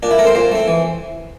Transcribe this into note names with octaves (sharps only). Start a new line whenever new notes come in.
A#2 D4
E4
A3 A#4
C4 C5
A#2 C5
A3 C4
E3